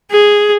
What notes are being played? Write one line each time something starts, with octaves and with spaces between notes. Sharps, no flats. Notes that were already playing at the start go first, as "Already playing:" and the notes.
G#4